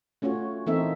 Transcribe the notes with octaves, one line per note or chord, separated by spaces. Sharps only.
A3 C#4 F4 F#4 C#5
E3 A#3 C4 D#4 A4 E5